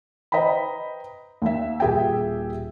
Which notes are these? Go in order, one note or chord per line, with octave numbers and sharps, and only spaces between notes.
B4 C5 D#5 G5 A#5 B5
D#2 E5
D#1 G4 G#4 E5 G5